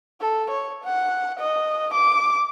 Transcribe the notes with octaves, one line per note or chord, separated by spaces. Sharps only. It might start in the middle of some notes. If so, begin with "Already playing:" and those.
A4
C#5
F#5
D#5
D6